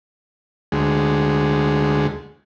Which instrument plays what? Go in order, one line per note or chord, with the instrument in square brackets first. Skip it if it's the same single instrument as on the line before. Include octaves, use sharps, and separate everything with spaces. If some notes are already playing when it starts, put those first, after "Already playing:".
[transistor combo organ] D2 G#3